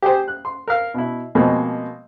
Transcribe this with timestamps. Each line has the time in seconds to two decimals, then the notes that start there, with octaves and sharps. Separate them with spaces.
0.02 G4 G#4 C5
0.28 F#6
0.45 C6
0.68 A#4 F5
0.94 B2 E4
1.35 B2 F3 G#3 A#3 C4